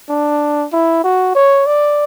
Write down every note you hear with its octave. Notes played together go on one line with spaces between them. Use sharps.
D4
E4
F#4
C#5
D5